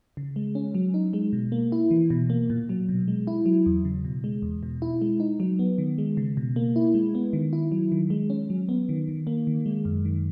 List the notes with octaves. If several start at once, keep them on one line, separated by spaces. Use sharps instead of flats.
C#3
G#3
C#4
F#3
D#4
G#3
B2
A#3
E4
E3
B2
A#3
A#2
F#3
B2
G#3
E4
F#3
E2
C#3
B2
G#3
E2
B2
E4
G#3
D#4
F#3
B3
D#3
G#3
C#3
B2
A#3
E4
G#3
B3
D#3
E4
F#3
D#3
G#3
C#4
F#3
B3
D#3
D#3
A#3
D#3
G#3
F#2
D#3